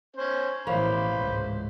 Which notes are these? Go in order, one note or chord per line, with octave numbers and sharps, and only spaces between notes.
C#4 C5
A1 B2 E3 F3 A#3 C#4 C5 B5
C#2 G#2